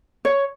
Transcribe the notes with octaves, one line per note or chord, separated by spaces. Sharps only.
C#5